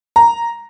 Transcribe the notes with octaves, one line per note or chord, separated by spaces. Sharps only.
A#5